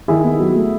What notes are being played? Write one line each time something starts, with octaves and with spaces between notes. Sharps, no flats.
D#3 E4 G#4
B3
F#3
A3